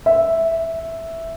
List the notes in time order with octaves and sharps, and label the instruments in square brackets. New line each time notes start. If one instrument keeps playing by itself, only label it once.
[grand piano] E5